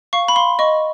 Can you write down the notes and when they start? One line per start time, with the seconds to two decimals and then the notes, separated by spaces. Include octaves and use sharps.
0.13 F5 C#6
0.28 B5
0.36 F5 C6
0.59 D#5 C#6